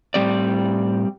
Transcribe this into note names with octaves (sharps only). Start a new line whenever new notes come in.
A2 G3 C4 G4 D5